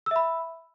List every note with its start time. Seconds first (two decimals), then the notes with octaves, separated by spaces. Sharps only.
0.06 E6
0.11 E5
0.16 B5